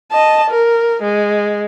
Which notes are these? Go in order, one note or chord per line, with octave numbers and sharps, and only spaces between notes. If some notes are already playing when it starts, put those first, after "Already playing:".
D#5 A5
A#4
G#3